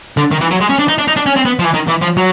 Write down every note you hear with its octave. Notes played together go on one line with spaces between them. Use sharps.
D3
D#3
E3
F#3
G#3
C#4
D4
D#4
D4
D#4
D4
C#4
C4
B3
F3
E3
D#3
E3
F3
F#3